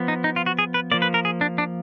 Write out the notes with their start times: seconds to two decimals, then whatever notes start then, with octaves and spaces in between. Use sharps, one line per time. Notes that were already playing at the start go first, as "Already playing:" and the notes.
Already playing: F3 B3
0.08 D#4
0.24 D#4
0.36 F4
0.46 F#4
0.59 G#4
0.74 B4
0.91 F3 A#3 D5
1.02 B4
1.14 A#4
1.25 G#4
1.41 D4
1.58 D4